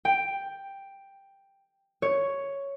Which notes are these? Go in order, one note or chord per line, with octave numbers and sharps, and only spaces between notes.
G5
C#5